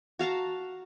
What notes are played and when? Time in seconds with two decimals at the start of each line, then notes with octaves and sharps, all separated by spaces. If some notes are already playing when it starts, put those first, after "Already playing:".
0.19 F#4 F5 A5 A#5